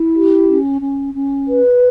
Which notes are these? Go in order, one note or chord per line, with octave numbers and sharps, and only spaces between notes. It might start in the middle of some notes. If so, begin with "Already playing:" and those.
Already playing: E4
G4
C#4
C#4
C#4
B4